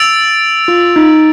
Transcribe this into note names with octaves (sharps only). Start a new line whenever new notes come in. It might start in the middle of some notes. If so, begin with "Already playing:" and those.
Already playing: E6 A6 D7 F7
F4
D#4